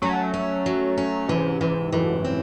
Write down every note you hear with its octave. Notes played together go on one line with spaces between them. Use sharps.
F#3 A3 C#4
C#4
F#3
C#4
G#2 C3 E3
G#2 C3 E3
F#2 A2 E3
C4